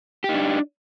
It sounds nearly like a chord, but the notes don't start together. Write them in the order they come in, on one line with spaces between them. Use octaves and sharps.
G4 D#4 D4